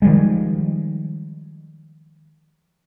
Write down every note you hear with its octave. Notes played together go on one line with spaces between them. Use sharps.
D#3 F3 G3 G#3